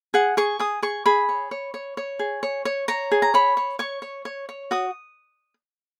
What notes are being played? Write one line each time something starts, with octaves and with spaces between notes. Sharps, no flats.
G#4 F#5
G#4 C#6
G#4 D#6
G#4 C#6
G#4 B5
C#5
C#5
C#5
C#5
G#4
C#5
C#5
C#5 A#5
G#4
A#5
C#5 B5
C#5
C#5 C#6
C#5
C#5
C#5
F#4 D#6